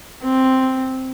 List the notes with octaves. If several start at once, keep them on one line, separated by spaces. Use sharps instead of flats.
C4